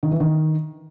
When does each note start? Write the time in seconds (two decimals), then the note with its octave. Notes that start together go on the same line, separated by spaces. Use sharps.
0.03 D#3
0.11 E3
0.20 D#3